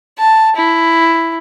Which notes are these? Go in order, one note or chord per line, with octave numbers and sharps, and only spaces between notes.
A5
E4